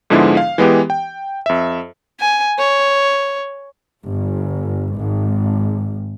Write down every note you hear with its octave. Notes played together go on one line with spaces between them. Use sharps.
G#2 D3 F3 G#3 B3 E4
F5
E3 G#3 B3 G4
G5
F2 E5
G#5
C#5
G1
G#1